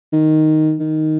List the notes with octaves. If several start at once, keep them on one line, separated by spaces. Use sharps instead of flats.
D#3
D#3